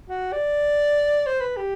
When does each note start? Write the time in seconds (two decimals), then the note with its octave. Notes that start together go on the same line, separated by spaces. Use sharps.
0.09 F#4
0.33 D5
1.26 C5
1.41 B4
1.56 G4